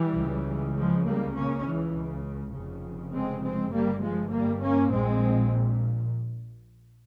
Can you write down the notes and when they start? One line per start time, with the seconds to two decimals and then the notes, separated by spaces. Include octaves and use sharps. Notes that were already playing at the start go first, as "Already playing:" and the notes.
Already playing: E3 G3
0.18 C#2 C#3
0.77 F3 G#3
1.07 G3 A#3
1.36 C#2 C#3 A#3 C#4
1.66 E3
1.96 C#3
2.54 F1 F2 C#3
3.14 G#3 C4
3.44 G#3 C4
3.74 G1 G2 G3 A#3
4.03 F3 G#3
4.33 G3 A#3
4.62 A#3 C#4
4.92 A#1 A#2 G#3 C4